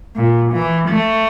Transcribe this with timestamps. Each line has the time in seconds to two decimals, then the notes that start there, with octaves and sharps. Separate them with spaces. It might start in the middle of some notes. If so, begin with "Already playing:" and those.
0.16 A#2
0.53 E3
0.89 A3